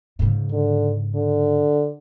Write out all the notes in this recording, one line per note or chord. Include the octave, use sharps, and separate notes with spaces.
G#2 C#3
D3
D3